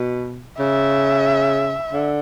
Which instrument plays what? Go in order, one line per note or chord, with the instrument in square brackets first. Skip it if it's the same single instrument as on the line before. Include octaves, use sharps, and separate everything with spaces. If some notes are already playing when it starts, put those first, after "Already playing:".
Already playing: [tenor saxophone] B2
[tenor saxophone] C#3 [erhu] E5
[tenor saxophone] D3